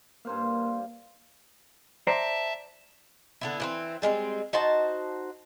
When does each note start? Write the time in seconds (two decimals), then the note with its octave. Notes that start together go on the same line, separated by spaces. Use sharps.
0.25 G2 A#3 C5 F5
2.07 C5 D5 E5 A5 A#5
3.41 D3 B3 E4
3.60 E3 A#3 C4
4.02 G3 G#3 A#3 C4
4.53 D#4 F#4 C5 A5